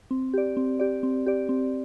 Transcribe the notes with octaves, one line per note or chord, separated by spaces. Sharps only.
C4
G4 D5
C4
G4 D5
C4
G4 D5
C4